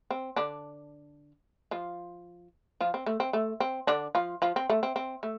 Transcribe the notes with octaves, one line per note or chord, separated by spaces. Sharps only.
C4
D3 D4
F3 F4
F3 F4
C4
A3
C4
A3
C4
D3 D4
F3 F4
F3 F4
C4
A3
C4
C4
A3